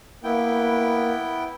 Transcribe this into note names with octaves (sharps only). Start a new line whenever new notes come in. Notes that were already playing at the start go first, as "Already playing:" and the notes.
A#3 B3 E4 G5